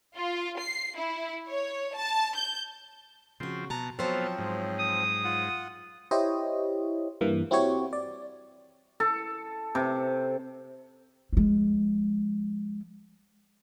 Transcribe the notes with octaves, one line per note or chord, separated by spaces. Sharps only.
F4
C7
E4
C#5
A5
G6
C#3 F3 C4 F#4
B2 A5 A#5
F3 F#3 B3 C4 F4 A4 C5 C#5
G#2
D#6
F4 F#5
E4 G4 C5 C#5 D#5
G2 E3 A#3
C4 E4 F#4 G4 C#5
D5
A4
C3
F3 G#3